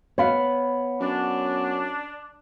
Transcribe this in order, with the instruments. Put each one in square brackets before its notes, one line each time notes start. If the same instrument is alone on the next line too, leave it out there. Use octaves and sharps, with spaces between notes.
[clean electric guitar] B3 B4 [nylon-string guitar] C#5 F5
[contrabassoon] F#2 [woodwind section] D4